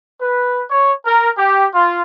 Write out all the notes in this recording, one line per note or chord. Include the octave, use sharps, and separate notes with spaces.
B4
C#5
A#4
G4
F4